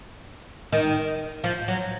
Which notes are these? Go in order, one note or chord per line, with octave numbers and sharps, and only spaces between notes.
D#3
F3
F#3